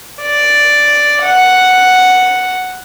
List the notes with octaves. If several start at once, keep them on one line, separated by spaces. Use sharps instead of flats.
D5
F#5